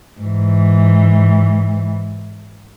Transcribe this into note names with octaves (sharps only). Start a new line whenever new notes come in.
G#2 E3